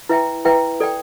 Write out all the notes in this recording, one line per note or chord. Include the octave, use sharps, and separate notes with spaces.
E4 B4 E5 G5
E4 B4 E5 G5
A4 D5 G5